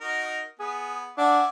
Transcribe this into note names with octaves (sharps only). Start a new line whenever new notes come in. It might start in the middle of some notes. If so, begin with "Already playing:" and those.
D#4 F#4 A#4
B3 G#4
D4 E5 F#5 G#5 D6